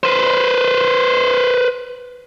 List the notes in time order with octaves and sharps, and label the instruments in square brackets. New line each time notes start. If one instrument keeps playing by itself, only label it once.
[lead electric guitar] B4 C5